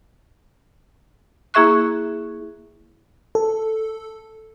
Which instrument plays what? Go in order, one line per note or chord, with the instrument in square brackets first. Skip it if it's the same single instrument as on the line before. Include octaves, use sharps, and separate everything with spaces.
[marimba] A#3 E4 G#4 E5 C#6 F#6
[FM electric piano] A4